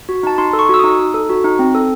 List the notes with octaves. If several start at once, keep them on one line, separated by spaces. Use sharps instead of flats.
F#4
D#4 A5
D#4 C6
A4
C#6
F#4 E6
D#4 D#6
D#4
A4
F#4
D#4
C4
A4